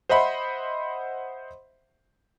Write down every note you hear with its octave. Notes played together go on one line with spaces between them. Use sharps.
C5 D#5 E5 F#5 B5 C6